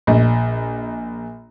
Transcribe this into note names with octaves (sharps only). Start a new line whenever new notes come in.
A#1 D#5